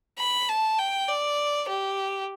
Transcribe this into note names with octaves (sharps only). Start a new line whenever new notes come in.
B5
A5
G5
D5
G4